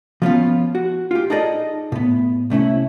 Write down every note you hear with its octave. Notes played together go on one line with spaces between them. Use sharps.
F3 B3 C#4 F4
F#4
F4 G4
D#4 G#4 A4 D5 D#5
A2 B3
C2 A3 C#4 E4